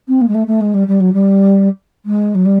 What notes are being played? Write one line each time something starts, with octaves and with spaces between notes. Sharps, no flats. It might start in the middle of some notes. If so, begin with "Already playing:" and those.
C4
A#3
G#3
A3
A3
G#3
G3
G3
F#3
G3
G#3
F#3
G3